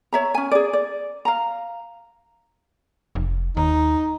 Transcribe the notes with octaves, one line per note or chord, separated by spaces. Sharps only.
C#5 E5 A#5
C#4 G#5
G#4 D5
D5
F5 A#5
F1
D#2 D#4